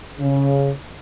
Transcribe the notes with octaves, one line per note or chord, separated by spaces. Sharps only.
C#3